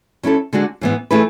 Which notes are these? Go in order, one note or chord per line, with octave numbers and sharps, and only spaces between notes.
F#3 C#4 E4 A4
D3 G#3 D4 F#4
G#2 E3 B3
E3 A3 E4 G#4 B4